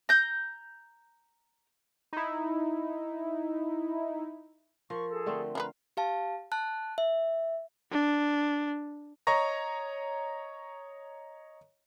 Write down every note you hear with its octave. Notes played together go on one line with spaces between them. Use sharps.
A#5 G6
D#4 E4
F3 A#4 C6 C#6
G#4 A4
D3 A3 C4
D4 E4 B4 F5 A#5
G4 F5 A5
A5 F#6
E5
D4
C#5 D#5 A#5 C#6 A#6